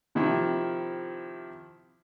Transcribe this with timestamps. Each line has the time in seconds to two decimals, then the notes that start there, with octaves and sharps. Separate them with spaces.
0.15 C3 D#3 F3 E4